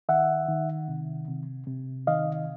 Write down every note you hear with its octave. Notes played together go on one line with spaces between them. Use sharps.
D#3 E5 F#5
D#3
C3
C3
C3
D#3 D#5 F5